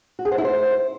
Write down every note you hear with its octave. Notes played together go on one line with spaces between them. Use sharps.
F#4
G#4
C5
E4
C5